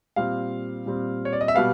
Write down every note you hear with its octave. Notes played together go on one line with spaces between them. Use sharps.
A#2 G3 C4 F5
A#2 G3 C4
C#5
D5
D#5
E5
B2 G3 B3 F5